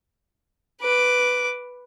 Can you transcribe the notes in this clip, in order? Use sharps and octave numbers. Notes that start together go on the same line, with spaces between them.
B4 D6